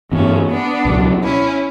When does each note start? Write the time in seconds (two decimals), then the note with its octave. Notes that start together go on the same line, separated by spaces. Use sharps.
0.12 G2 E3 A3 B3 C#4
0.49 B3 D4
0.85 C#2 B2 F#3
1.22 C#4 E4